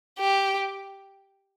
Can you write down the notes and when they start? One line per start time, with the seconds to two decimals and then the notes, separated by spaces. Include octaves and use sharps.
0.19 G4